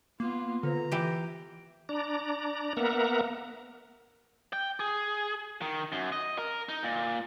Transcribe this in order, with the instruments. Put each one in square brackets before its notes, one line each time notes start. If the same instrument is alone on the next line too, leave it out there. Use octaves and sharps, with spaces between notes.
[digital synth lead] A#3 [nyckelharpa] B3 F4
[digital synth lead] D3 [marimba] F4 B4 C5 [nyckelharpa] A#5
[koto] E3 G4 [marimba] G6
[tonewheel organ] D4 D5 A#5
A#3 B3 A#4 E5 F#5 A#5
[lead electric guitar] G5
G#4
D#3
F#2
D#5
A#4
D#4
A#2